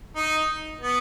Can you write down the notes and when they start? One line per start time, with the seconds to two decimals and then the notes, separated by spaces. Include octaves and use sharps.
0.17 D#4
0.81 B3